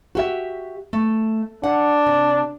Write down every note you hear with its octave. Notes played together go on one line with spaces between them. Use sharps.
F#4 G4 E5
A3
D4 F#5
C3